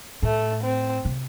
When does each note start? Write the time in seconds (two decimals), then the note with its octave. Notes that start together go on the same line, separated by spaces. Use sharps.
0.22 A2 A3
0.63 C4
1.05 C3